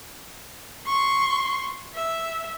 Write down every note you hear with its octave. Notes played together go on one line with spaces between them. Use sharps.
C6 C#6
E5